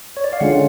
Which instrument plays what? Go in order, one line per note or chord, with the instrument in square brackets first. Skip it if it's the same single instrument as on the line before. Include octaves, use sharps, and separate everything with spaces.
[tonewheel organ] C#5
D5
F5
D3 G#3 C#4 F4 F#5